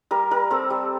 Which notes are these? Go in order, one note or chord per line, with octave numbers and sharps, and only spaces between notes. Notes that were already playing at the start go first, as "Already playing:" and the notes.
G3 A#4
G3 A#4
C4 A4
G3